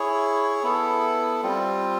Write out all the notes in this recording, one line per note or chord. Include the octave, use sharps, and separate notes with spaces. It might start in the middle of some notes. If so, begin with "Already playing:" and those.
Already playing: E4 G#4 C#5
B3 E4 A4
G3 C4 F4